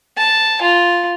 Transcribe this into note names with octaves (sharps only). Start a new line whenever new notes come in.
A5
F4